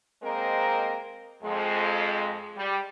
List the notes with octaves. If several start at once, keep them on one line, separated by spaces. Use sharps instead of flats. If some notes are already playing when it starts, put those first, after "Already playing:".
G#3 A#3 C4 A#4 C5 D#5
F2 G#3
G3